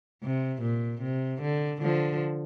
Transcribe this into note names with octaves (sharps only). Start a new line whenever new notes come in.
C3
A#2
C3
D3
D3 F3